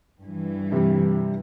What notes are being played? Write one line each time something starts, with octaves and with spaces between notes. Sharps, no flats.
G2 E3
C3 G3